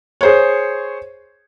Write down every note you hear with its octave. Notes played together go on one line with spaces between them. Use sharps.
G#4 C5 C#5